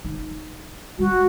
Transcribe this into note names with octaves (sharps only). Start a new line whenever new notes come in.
D#4
G3 F#4